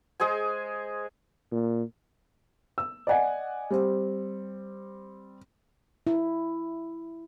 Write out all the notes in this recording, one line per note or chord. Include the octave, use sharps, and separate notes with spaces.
G#3 G#4 C5 G#5
A#2
E6
D5 D#5 F#5 G#5
G3 C4
E4